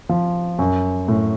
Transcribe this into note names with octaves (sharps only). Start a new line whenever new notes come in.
F3
F#2
A2